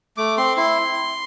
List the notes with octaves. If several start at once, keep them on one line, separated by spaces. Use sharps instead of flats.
A3 D6
C4 C6
E4 C6